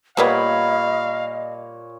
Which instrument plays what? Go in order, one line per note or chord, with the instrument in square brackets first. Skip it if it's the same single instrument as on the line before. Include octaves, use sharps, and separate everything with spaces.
[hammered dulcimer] A#2 C#5 B5 [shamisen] G3 A#3 B3 [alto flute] D#5 [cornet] F5